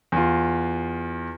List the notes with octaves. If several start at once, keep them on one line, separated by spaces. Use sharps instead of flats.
E2 F4